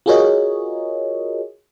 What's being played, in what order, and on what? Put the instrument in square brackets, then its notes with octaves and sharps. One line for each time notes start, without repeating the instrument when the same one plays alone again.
[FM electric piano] F4 F#4 G#4 A#4 C#5 D#5